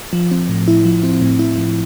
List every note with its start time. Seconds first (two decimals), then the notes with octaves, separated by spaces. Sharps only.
0.13 F3
0.31 C4
0.49 A2
0.68 E4
0.85 F3
1.03 C4
1.21 A2
1.39 E4
1.58 F3